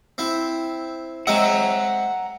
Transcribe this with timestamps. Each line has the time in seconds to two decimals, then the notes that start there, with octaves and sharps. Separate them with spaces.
0.18 C4 E4
1.27 G#3 C4 E5 F#5 A#5